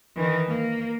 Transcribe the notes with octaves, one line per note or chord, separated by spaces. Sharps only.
D#3 E3
A#3